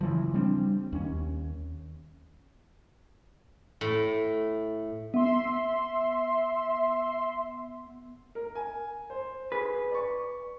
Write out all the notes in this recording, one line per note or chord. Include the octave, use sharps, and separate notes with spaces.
C#3 E3 F3
G3 C4 D4
D#2 C#4
A2
B3 E5 C6
A#4
G#5
C5
G#4 B4
D5 C#6